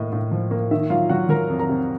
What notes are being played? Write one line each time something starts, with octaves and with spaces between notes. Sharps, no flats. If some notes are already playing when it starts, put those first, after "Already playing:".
Already playing: A2 A#3 D#5
A2
F3
A#3
D#3 E5
F#3 F4 F5
F#3 F#4 F#5
F#3 A#4 A#5
F2
A#4 A#5
C3